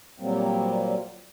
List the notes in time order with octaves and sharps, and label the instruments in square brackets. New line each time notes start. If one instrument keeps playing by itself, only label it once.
[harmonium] A#2 F#3 G3 A#3 C4